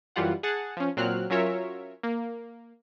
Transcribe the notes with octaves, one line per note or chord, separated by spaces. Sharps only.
F#2 E3 G3 F4 F#5
G#4 F#5 A5
F3 C#4
A#2 F#3 C4 F6 F#6
F#3 C#4 F4 A#4 C#5 E5
A#3